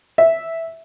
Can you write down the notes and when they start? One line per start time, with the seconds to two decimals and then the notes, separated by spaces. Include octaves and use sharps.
0.18 E5